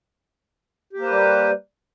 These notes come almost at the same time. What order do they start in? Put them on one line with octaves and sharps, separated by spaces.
G4 A#3 C5 B4 G3